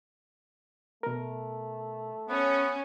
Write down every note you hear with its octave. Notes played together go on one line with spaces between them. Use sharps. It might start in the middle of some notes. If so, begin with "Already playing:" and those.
B2 A3 A#4
B3 C#4